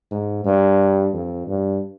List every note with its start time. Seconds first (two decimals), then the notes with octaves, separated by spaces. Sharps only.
0.11 G#2
0.45 G2
1.13 F2
1.47 G2